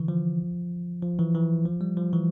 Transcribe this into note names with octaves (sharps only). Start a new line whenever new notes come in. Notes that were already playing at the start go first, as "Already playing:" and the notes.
Already playing: D3 E3
F3
F3
E3
E3
F3
G3
F3
E3